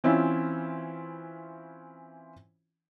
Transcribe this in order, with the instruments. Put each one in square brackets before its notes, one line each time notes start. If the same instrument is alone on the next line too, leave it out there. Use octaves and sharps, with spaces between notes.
[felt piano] E3 C4 C#4 E4 F4